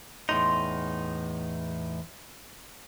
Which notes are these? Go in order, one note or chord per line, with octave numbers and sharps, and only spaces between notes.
E2 A2 D#4 C6